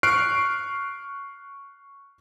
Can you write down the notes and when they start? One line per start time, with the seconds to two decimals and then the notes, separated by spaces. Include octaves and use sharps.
0.03 C#6 F6 F#6 C7 D7